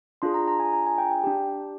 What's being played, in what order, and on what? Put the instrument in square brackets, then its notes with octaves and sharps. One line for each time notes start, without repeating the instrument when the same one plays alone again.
[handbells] D4 F4 G#4 C6
A#5
A#5
G#5
A#5
G#5
G5
G5
D4 G4